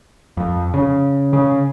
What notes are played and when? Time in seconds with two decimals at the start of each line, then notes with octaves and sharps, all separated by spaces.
0.37 F2
0.74 C#3
1.33 C#3